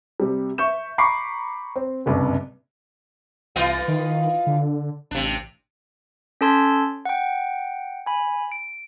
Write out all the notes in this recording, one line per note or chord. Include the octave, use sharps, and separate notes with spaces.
C3 G3
E5 C#6 G6 E7
A#5 B5 C#6 D6 C7
C4
F#1 C2 G2
C2 E3 F4 D#5
D#3
D3
A1 C3 D4
C#4 A4 A5 C6 G#6
F#5 G5
G#5 B5
D7